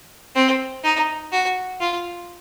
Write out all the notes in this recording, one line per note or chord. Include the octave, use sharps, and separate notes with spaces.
C4
D#4
F#4
F4